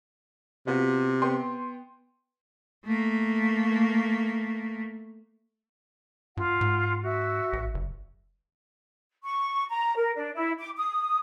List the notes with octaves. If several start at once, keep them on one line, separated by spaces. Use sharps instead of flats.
C3 B3 F4 F#4
B3 G5 C6
A3 A#3
G2 F4 F#5
G#2
F#4 E5
A1
F#1
C#6
A#5
A#4
D4
E4
D6
D#6